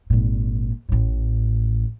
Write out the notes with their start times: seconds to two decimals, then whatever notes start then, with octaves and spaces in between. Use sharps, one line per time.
0.10 G#1 A#2
0.89 A1 A2